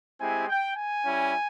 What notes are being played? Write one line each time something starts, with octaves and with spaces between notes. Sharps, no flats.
G#3 C4 E4 G4 G#5
G5
G#5
G3 C#4 E4